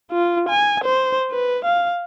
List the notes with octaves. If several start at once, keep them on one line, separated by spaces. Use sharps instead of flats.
F4
G#5
C5
B4
F5